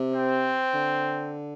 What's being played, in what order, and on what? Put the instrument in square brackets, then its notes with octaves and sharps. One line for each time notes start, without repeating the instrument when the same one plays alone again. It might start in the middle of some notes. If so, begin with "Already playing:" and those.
Already playing: [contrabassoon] C3
[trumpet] C4
[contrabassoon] D3